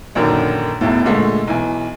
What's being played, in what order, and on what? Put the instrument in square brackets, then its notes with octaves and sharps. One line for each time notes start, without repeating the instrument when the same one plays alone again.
[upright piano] A#1 F#2 D3 D#3
E1 E2 A2
A#2 D3 G#3 A3
B1 E3 G#5